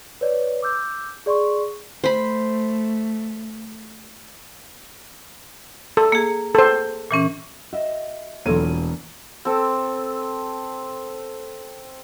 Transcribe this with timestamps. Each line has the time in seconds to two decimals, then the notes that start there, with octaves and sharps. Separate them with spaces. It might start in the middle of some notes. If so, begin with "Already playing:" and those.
0.21 B4 C#5 D5
0.62 D6 E6 G6
1.26 G#4 D5 C6 C#6
2.04 A3 C5 B5
5.97 A4
6.12 A#3 G#4
6.55 A4 C5
7.11 A#2 E3 C#4
7.73 F#4 D#5 E5 E7
8.45 E1 E3 F#3 A#3 F4 A4 C#5 D#7
9.45 C4 A4